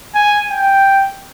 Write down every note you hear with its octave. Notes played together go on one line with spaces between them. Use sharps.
G#5
G5